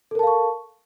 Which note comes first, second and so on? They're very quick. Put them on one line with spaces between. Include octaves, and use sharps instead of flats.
A4 A#4 A5 F5 C#6